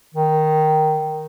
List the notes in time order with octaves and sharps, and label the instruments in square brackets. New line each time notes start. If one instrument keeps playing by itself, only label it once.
[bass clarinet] D#3